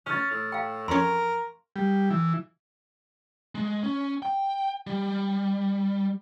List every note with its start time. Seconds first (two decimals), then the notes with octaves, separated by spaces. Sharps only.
0.06 C#4 F6 A6
0.31 A2
0.52 F5 G5
0.88 F2 C#4 A#4 C6 C#6
1.76 G3
2.11 E3
3.55 G#3
3.83 C#4
4.22 G5
4.87 G3